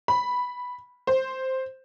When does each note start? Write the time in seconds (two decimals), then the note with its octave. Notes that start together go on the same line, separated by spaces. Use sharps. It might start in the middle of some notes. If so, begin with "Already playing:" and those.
0.08 B5
1.07 C5